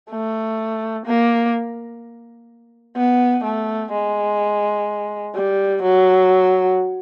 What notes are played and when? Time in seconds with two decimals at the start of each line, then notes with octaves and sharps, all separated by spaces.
0.11 A3
1.06 A#3
2.97 B3
3.44 A3
3.92 G#3
5.35 G3
5.83 F#3